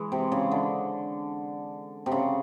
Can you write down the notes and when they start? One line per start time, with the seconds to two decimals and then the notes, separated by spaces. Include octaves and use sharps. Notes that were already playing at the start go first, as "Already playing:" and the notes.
Already playing: E3 G#3
0.12 C3
0.32 C#3
0.51 D3
2.06 C3
2.12 C#3